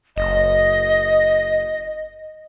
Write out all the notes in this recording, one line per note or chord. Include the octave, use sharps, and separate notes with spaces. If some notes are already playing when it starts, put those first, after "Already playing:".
F#1 D#5